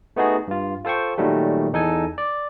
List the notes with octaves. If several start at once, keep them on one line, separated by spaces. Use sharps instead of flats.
A3 B3 D#4 F#4 G#4
G2 F4
F4 A4 C5 G5 C#6
A#2 D#3 F#3 G3 A3
E2 D#4 A4 G#5
D5